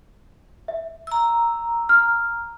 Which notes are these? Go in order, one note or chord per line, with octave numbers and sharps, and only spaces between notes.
E5
A#5 E6
F6